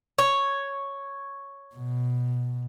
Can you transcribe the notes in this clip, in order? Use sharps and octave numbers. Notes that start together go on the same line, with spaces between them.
C#5
B2